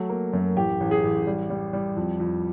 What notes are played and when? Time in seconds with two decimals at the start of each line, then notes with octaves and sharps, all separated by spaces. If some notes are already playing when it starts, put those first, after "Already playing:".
Already playing: F#3 A3
0.10 A#3
0.33 F#2
0.56 A1 G4
0.80 A1
0.91 G#4
1.03 A1
1.27 G3
1.50 G3
1.73 G3
1.97 F2
2.20 F2